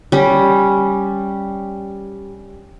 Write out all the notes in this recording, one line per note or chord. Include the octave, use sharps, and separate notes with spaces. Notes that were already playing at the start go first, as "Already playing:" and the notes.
G3 C#4